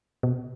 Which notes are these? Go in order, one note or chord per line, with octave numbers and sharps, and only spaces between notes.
B2